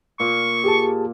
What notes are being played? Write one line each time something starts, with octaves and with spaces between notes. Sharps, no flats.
A#2 C#6
G4 G#4 A5